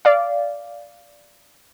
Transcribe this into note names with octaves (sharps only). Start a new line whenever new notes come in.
D5 F5